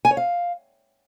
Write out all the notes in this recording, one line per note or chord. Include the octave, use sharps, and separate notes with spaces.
G#5
C#5
F5